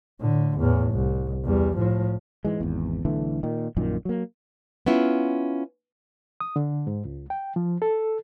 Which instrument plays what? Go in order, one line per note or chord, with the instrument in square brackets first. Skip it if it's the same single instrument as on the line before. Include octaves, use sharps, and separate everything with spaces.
[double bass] A2 D3
E2 A2
C2
E2 G3
A2 F3
[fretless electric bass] G#2 E3 G#3
G#1 E2
B1 D3 E3 A3
A#2 D#3
A#1 F#2 A#2 D#3
F#3 A#3
[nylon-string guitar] B3 C#4 E4 F4
[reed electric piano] D#6
D3
G#2
C#2
G5
F3
A4